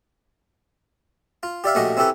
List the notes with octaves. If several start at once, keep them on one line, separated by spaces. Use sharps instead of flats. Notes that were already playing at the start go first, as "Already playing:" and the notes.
F4
G4 D5 E5 F5
A#1 A3 C#4 F#4 G4 D#5
C4 C#4 E4 G4 A4 B4